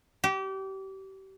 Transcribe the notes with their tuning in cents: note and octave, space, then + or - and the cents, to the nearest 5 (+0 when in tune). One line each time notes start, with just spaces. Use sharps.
G4 -30